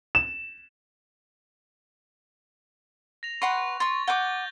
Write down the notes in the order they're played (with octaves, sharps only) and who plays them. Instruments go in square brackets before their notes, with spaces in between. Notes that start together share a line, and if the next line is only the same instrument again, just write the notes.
[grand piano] E7
[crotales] A#6 F7
[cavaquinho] B4 F#5 C6 [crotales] C#6
[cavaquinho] C6 C#6 [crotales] A6
[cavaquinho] F#5 D6 [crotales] C#6 G6 G7